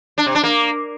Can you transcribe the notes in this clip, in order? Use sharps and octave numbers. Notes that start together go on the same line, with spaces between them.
D4
C3
D4
A#3